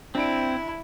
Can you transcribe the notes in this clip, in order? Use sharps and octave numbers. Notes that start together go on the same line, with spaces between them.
C4 D4 E4 D7